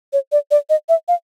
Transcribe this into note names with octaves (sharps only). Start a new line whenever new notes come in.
C#5
D5
D5
D#5
E5
F5